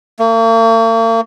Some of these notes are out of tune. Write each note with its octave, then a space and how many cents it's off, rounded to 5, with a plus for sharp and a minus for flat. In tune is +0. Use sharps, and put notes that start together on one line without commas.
A#3 -45